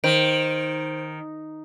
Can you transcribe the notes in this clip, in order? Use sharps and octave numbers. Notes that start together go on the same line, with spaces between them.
D#3 C5 D7